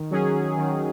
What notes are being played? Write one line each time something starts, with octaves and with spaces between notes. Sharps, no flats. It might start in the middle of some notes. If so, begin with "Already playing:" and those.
Already playing: D#3
F#3 C#4 G#4
D#3